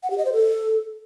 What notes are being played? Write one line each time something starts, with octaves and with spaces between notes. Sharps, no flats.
F#5
G4
D#5
C5
A4